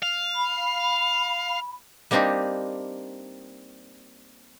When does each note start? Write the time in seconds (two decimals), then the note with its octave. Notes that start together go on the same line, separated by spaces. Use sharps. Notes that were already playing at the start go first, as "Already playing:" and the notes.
0.03 F5
0.35 B5
2.11 G3 A#3 C4 D4 D#4 G4